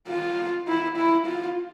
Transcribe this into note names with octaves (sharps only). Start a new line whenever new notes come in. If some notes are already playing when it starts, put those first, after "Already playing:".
F4
E4
E4
F4